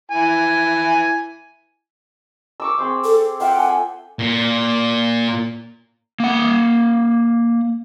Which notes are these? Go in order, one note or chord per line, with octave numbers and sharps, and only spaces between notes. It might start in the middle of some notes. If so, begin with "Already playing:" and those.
E4 G#5
C#6 D6 E6
C4 G#4 G5
A4
F4 E5 F#5 G5
A4 G5 G#5
A#2
A#3 F#5